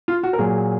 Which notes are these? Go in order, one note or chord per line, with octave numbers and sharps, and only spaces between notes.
F4
F#4
A#4
A#2 F#3 G#4